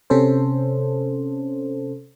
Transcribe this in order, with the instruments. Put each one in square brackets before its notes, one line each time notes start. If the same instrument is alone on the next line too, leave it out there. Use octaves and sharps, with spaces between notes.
[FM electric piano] C3 C#4 A4 C5